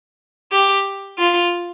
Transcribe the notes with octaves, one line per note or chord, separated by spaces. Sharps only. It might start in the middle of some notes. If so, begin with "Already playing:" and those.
G4
F4